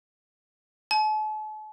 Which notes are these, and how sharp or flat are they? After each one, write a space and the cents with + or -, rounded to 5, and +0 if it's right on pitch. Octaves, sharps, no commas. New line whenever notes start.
A5 -45